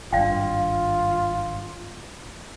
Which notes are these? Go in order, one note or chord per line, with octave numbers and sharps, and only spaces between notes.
G#1 G2 F4 D5 F5 G5